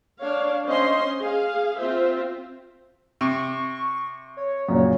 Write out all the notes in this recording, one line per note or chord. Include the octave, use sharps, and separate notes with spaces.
D4 C#5 F5
C#4 C5 D#5 C6
G#4 F5
C4 F4 C5 E5
C3 C#6
C#5
F#2 A#2 C#3